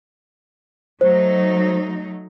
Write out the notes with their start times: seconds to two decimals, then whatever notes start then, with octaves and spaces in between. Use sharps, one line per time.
1.01 F#3 A3 D#4 C5